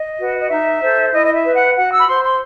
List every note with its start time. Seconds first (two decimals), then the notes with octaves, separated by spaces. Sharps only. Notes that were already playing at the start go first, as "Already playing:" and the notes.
Already playing: D#5
0.18 F#4 B4
0.39 D#5
0.49 D#4 E5
0.81 A4 C5
1.12 E4 D#5
1.25 D#5
1.33 E5
1.44 B4
1.54 F#5
1.75 F#4 F#5
1.91 E6
2.00 B5
2.07 C5 C6
2.23 C6